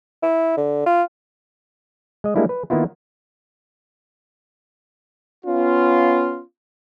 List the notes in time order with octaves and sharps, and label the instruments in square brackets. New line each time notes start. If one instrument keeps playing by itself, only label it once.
[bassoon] E4
D3
F4
[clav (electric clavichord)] G#3 D#5
G3 G#3 A#3 D4 E4
B4
D#3 A#3 B3 E4 F4
[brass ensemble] B3 C#4 F4